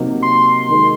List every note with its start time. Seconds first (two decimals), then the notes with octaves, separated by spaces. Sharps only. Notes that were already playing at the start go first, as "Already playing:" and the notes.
Already playing: C3 F#3 A#3 D#4 A#4
0.22 C6
0.69 D#3 G#3 D#4 A#4